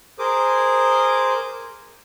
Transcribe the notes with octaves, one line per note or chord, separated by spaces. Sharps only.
G#4 A#4 C5 D6 D#6